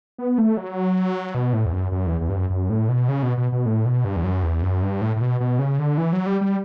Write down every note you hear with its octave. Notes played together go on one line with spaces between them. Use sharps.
B3
A3
F#3
B2
A2
E2
F#2
F#2
E2
E2
G2
F#2
F#2
A2
B2
C#3
B2
B2
B2
A2
B2
G2
E2
F#2
E2
F#2
G2
A2
A2
B2
B2
C#3
D3
E3
F#3
G3
G3